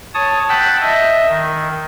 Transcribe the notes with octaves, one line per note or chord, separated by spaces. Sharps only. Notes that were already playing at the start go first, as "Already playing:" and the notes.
C#5 A5 D#6
F#5 G5 A5 B5 E6
D#5 E5
D#3